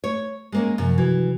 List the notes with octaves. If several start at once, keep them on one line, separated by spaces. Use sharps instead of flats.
A3 C#5
G#3 A#3 C#4
F#2 C3 F3 F#3
E3 F#4 G#6